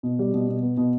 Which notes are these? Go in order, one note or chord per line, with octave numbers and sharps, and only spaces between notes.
B2
G3
B2
B2
B3
B2